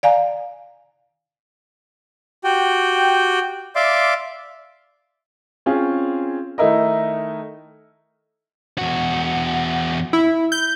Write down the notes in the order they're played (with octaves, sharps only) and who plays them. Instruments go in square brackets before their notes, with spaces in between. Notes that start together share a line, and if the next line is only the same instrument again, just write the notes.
[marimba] D5 F5 G#5 A#5
[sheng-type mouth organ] F#4 G4 G5
D5 E5 F5 C6 D6
[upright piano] C4 C#4 F4 G#4
D#3 A3 D#4 E4 A#4 D#5
[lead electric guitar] E2 F#4
[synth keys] E4
G6